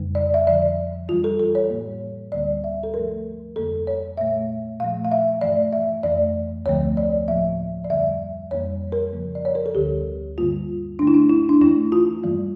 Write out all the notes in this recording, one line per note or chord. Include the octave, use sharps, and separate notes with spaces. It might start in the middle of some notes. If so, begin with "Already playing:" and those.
Already playing: F2 C#3 G3
D5
E5
F2 D3 F3 D5
E2 E3 G3 F4
A4
A4
C#5
A2 E3 G3 A#3
D2 D3 G3 A#3 D5
E5
A4
G2 F3 A3 A#4
F2 D3 G3 A#3 A4
C#5
A#2 A3 E5
A#2 F3 A3 F5
F5
E5
G2 E3 A3 D5
E5
F2 E3 A3 D5
D2 D3 F3 A3 C#5
D5
A2 F3 A#3 E5
D5
F2 D3 G3 A#3 E5
F2 E3 G3 A#3 C#5
A#4
E2 C#3 F3 A#3
D5
C#5
A#4
A4
D2 D3 G3 G4
G2 D3 G3 A#3 F4
G2 D3 A3 D4
E4
D4
E4
D4
E2 E3 A3 E4
F4
G2 E3 G3 A#3